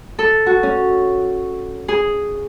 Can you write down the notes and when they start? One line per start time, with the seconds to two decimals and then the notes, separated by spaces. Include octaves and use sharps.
0.19 A4
0.46 F#4
0.63 C#4
1.88 G#4